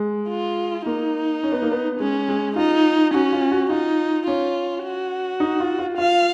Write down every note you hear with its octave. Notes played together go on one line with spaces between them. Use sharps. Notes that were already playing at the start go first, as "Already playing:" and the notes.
Already playing: G#3
F4
A#3 D#4
C#4
B3
A#3
B3
G#3 C#4
G#3
D#4 F4
C#4 F#4
F4
F#4
D#4 F4
C#4 F4
F#4
D#4
F4
F4
F4 F5